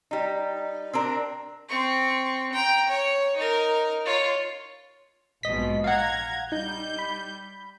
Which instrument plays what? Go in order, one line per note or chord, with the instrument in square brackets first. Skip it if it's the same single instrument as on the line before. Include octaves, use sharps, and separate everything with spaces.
[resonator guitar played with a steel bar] G3 D#4
C4 D4 A#4
[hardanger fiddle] C4 C#6
G5 A#5
C#5
D#4 A#4
F4 C#5
[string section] A#1 G#2 B2 [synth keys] D#5 B6
[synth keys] F5 F#5 [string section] A#5 G#6
[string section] G3 G6 [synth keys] D#4
[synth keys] B5